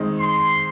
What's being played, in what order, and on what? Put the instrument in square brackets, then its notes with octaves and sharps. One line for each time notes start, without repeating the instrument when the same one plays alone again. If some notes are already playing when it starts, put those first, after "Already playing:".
Already playing: [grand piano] D#3 G#3 C4 D#4
[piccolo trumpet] C6